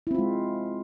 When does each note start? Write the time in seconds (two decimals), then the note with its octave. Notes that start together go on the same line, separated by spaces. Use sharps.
0.07 E4
0.11 C4
0.15 F4
0.18 G#3